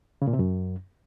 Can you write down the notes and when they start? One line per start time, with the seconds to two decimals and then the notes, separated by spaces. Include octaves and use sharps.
0.22 C#3
0.27 A#2
0.33 C3
0.39 F#2